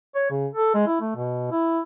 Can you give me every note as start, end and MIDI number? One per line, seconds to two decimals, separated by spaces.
0.15 0.27 73
0.30 0.47 49
0.54 0.72 69
0.74 0.87 56
0.87 0.96 64
1.00 1.11 57
1.16 1.51 47
1.51 1.80 64